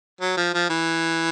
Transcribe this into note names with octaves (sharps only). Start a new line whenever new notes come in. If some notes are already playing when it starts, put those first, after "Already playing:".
F#3
F3
F3
E3